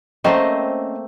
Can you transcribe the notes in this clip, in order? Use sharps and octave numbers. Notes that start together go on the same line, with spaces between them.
A3 A#3 C4 C#4 C5 D#5